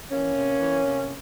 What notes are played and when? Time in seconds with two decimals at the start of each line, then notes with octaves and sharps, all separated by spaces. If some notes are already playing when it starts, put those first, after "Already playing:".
0.11 E3 A#3 C#4
0.36 C3
0.60 E3
0.84 C3